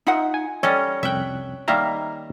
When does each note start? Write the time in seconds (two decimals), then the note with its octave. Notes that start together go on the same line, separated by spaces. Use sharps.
0.07 D#4 F4 D#5 E5 F#5
0.34 G#5
0.63 G3 C#4 A4 C#5 D#5
1.03 C2 F2 E5 G5 F#6
1.68 D#3 G3 A#3 D#4 E5 A#5